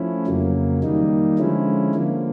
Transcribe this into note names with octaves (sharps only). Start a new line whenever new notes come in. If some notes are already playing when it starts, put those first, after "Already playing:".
Already playing: F3 A3 C#4 E4
F2 C#3 F#3 A#3
D#3 G3 A#3 D#4
D3 F3 G#3 C#4 E4
D3 F3 A#3